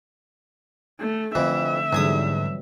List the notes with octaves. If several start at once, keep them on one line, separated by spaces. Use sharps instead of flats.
A3
F2 D3 E3 A3 C4 E5
E2 G#2 D3 E3 F#3 G3 G#5 D#6